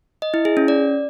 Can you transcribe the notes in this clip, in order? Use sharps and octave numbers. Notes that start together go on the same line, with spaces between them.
D#5
E4
G#4
C#4
D5